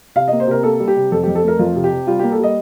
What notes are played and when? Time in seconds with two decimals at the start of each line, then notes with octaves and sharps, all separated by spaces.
0.16 C3 F5
0.28 A#3 D#5
0.40 C5
0.47 C3 A#4
0.63 A#3 A4
0.79 G3
0.88 G4
0.96 C3
1.12 F2 A4
1.23 F2 G4
1.35 A4
1.43 A3 A#4
1.59 F2 F4
1.75 C3
1.84 G4
1.91 C3
2.07 G3 F4
2.19 A#3 G4
2.32 A4
2.39 G3 D#5